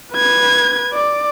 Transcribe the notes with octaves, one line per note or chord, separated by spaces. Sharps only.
B4 G#6
D5